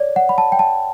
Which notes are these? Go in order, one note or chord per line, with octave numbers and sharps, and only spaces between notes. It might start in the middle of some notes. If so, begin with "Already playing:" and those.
Already playing: C#5 D5
F#5
B5
A5
G5
A5